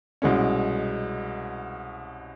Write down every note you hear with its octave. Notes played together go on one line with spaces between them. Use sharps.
C2 B2 G#3 C#4